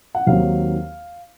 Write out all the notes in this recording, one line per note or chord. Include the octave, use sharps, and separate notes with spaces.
F#5
D#2 D#3 F#3 C4 F5